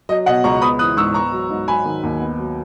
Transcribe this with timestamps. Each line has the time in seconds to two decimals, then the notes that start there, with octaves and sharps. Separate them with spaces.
0.09 F#3 D#5
0.26 B2 D#5 F#5
0.44 C#2 A#5 C#6
0.62 B3 B5 D#6
0.79 E3 D#6 F#6
0.97 G#2 C#6 E6
1.14 B3 A#5 C#6
1.32 F#3
1.51 G#2
1.68 F#3 G#5 B5
1.85 D#3
2.03 D#2
2.21 B3
2.39 F#3